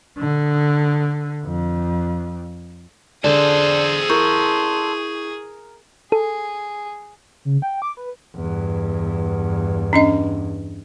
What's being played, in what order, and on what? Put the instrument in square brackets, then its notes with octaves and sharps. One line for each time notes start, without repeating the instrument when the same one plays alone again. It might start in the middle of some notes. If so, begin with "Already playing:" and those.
[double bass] D3
F2
[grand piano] D3 [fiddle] G#4 [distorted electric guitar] A4 C5 [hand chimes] D5
[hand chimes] E4 C#6 G6 [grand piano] A#4
[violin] G#4 [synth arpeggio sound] A4
[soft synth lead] C#3
G5
D6
B4
[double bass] E2 G2
[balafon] C#4 D4 D#5